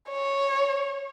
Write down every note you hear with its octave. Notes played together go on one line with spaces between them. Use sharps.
C#5